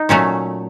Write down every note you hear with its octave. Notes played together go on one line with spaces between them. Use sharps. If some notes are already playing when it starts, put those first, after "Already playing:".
Already playing: D#4
A#2 F#3 A3 C#4